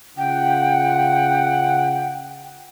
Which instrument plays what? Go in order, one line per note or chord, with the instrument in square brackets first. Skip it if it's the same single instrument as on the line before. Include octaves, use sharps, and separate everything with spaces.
[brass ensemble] C#3 F4 F#5 [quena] G5